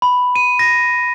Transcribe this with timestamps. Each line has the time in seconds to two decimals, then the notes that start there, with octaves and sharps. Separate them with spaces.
0.02 B5
0.35 D#7
0.59 A#6